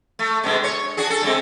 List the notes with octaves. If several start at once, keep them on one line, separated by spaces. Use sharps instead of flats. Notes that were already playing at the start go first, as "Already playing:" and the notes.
A3
B2 D3 G#3
C#5
D4 F#4 G#4
A4
D3 G#3 C4